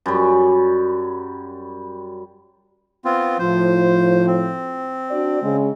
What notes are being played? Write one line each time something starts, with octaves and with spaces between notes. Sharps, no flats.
F#2 G3
B3 C4 F4
A2 F3 C5
C4
D4 F#4 D5
C#3 G#3